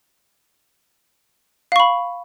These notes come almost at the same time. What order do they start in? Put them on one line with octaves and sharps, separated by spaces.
F5 C#6 B5